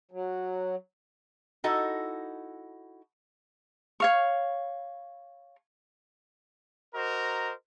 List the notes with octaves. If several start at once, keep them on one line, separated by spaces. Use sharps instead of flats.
F#3
D#4 E4 F#4 A4 D#5
C#5 F5 C#6
F#4 A#4 C5 D#5 A#5